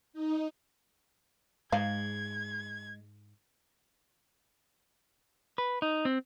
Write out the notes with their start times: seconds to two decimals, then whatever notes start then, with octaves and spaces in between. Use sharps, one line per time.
0.13 D#4
1.72 G#2 G#3 F5 G#6
5.58 B4
5.82 D#4
6.05 C4